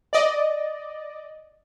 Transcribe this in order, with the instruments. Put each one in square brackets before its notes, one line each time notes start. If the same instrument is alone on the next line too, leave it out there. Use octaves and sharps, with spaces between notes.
[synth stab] D5 D#5